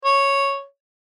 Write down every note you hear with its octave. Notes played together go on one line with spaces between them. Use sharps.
C#5